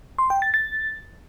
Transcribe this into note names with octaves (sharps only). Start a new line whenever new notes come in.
C6
G5
A6
A6